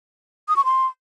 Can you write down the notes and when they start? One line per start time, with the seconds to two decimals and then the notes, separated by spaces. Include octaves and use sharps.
0.48 D#6
0.56 C#6
0.65 C6